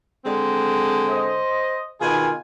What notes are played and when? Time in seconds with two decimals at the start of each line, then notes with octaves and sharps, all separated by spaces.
0.25 D3 G#3 C4
1.09 C5 D#5
2.01 B2 D#3 F4 G#4 G#5